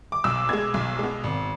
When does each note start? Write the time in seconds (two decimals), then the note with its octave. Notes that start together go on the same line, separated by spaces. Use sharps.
0.12 D6
0.24 B1 E6
0.49 B2 G#3 G#6
0.74 B1
0.99 B2 G#3
1.24 G#1